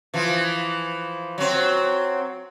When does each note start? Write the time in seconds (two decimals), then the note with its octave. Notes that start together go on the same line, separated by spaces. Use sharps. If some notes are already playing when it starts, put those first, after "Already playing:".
0.14 E3 F3
1.38 F#3 C4